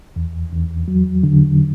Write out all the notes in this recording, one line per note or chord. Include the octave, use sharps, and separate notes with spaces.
E2
E2
F#3
D3